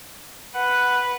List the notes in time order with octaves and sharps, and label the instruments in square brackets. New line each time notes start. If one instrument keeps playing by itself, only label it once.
[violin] B4 [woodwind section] F#5